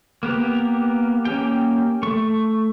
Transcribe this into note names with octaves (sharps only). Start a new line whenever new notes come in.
A#3 B3 G4 A#4
A#3 C#4 G4 G5
A3 C#6